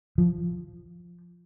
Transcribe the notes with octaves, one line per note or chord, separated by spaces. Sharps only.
F3